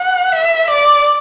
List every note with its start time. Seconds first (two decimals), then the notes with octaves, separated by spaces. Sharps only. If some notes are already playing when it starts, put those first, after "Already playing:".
Already playing: F#5
0.32 E5
0.70 D5